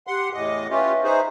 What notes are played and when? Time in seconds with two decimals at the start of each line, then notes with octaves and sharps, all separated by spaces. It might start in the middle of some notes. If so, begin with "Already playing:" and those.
0.07 G4 F#5 C6
0.33 E2 A2 D#5 G#5 D6
0.70 C#4 F4 G4 B4 E5 C#6
1.04 D#4 G#4 C5